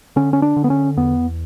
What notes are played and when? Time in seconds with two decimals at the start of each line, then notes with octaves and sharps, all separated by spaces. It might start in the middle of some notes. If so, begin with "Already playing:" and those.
0.16 D3 C#4
0.33 C#4
0.42 D4
0.56 D3
0.64 B3
0.70 C#4
0.97 E2 B3